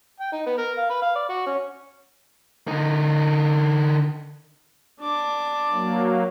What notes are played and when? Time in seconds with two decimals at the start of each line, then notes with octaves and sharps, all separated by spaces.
0.20 G5
0.32 D#4
0.46 B3
0.58 A#4
0.78 F5
0.90 B4
1.02 F5
1.15 D5
1.29 F#4
1.46 C#4
2.68 D3 D#4
5.01 D4 D6
5.72 F#3 A#3